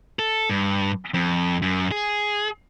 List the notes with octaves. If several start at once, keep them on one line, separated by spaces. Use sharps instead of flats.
A4
G2
F2
F#2
G#4